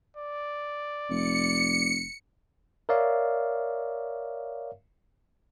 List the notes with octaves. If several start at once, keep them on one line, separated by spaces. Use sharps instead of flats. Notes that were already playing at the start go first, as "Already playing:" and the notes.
D5
F1 C#7
A#4 C#5 D5 E5 F5